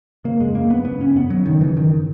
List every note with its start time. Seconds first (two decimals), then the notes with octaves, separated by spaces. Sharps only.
0.24 C#3 A#3
0.40 F#2 G#3
0.55 F#2 A#3
0.70 F#2 B3
0.85 C#3 B3
1.00 F#2 C#4
1.15 F#2 B3
1.30 C#3 F#3
1.46 F#2 D#3
1.61 C#3 E3
1.76 F#2 D#3